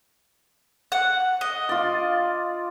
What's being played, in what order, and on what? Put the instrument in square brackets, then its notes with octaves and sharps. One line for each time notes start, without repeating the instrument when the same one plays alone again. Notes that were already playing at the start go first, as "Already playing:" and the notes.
[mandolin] F#5
D#5
[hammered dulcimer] F4 D5